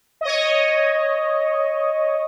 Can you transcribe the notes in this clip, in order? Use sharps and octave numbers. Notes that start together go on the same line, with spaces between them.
C#5 D#5